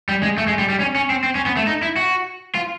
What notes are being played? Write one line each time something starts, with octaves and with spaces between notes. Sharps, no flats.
G3
G#3
A3
G#3
G3
G3
C#4
C#4
C4
C4
C#4
B3
A3
D#4
E4
F#4
F4